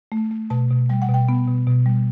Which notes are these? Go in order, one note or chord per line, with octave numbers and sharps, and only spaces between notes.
A3
A3
B2 A5
B2
G3 G5
F#5
B2
G5
B3
B2
B2
G3